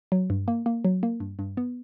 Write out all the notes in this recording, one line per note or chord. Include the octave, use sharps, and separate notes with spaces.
F#3
G2
A#3
A#3
F#3
A#3
G2
G2
B3